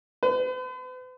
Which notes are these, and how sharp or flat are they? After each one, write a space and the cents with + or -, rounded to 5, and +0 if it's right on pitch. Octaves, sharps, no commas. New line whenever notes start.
B4 +45